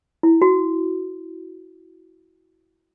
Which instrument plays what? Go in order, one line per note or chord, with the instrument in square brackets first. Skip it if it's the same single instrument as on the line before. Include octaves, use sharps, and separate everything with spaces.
[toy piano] E4
F#4